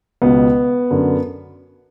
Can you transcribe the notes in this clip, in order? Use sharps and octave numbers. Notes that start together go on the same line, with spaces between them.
C#2 B2 B3
F#2 D3